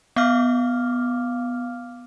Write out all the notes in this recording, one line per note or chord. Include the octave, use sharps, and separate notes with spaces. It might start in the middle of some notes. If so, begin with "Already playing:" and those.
B3 F5 D6 F6